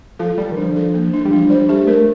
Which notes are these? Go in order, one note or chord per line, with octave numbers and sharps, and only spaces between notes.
F3 A4
G3 A4
D#3
F3 D4
A4
A#3
D4
G3
F3 D4
G3 C5
A3 G4
A3 A#4